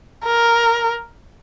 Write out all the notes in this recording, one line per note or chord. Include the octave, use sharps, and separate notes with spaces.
A#4